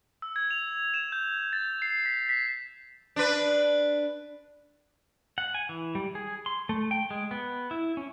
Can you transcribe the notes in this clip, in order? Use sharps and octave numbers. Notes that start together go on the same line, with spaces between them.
E6
G#6
F7
E7
G6
A6
C7
B6
B6
D4 B4
F#5
G#5
E3
G3
G#4
C6
A3
G5
G#3
B3
E4
C#4